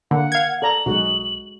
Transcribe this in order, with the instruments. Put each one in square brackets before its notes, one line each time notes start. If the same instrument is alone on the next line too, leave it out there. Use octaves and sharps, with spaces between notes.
[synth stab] D3 [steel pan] A#3 [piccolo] F#5
[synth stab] F5 G#6
[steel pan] A4 D5 A#5 [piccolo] F#7
[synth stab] B1 [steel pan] G#3 F#4